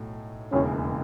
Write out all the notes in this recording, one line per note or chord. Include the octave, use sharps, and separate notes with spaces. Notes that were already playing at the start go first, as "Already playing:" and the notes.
Already playing: B1 A2 F#3
E1 D#2 C#3 E3 C#4